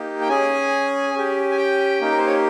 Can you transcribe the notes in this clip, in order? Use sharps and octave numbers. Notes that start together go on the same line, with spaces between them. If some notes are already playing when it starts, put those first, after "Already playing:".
Already playing: A#3 D#4 G4
G5
C#4 G#4 G#5
C#4 G4
G#5
G5
A#3 D#4 G4
A#4
C5
C#5